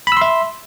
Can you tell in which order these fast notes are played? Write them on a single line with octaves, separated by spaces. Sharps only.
B5 E6 C6 E5